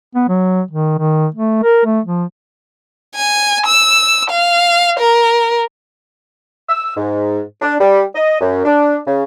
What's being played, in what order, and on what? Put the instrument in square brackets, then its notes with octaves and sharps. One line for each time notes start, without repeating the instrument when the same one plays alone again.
[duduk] B3
F#3
D#3
D#3
A3
A#4
A3
F3
[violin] G#5
E6
F5
A#4
[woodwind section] E6
G#2
D4
G3
D#5
F#2
D4
C#3